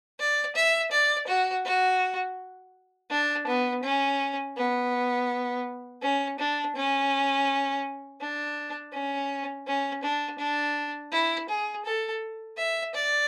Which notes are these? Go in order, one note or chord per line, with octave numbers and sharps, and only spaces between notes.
D5
E5
D5
F#4
F#4
D4
B3
C#4
B3
C#4
D4
C#4
D4
C#4
C#4
D4
D4
E4
G#4
A4
E5
D5